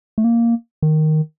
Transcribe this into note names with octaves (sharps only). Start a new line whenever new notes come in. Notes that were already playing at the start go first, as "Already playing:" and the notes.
A3
A#3
D#3